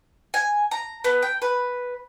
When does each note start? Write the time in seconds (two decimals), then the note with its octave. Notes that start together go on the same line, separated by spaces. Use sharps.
0.34 G#5
0.71 A#5
1.04 B3
1.22 G5
1.42 B4